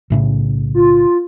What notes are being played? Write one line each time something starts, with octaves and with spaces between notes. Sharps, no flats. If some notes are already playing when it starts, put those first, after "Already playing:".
B1 A2 C#3
F4